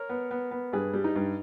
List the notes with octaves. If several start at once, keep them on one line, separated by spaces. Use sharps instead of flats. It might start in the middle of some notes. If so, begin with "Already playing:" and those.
Already playing: A#4 C#5
B3
B3
B3
G2 G#4 B4
G3
D#4
G2